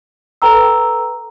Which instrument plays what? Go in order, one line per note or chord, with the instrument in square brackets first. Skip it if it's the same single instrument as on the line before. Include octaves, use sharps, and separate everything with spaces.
[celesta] A4 B4 G5 A#5 E6